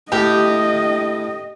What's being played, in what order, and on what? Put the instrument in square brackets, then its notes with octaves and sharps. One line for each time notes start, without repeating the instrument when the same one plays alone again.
[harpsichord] A2 [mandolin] G4 [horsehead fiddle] D#5